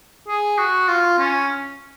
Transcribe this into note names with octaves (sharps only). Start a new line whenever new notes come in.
G#4
F#4
F4
C#4